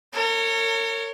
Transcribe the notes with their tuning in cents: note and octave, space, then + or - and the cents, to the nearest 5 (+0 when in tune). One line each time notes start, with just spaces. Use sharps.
A#4 -45 C#5 +0